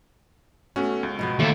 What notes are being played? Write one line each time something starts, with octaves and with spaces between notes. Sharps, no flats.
A3 B3 C#4 F#4
C#2
B2 F3 B3
D#2 A3